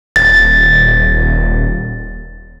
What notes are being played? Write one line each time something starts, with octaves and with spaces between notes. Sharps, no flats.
D#1 A6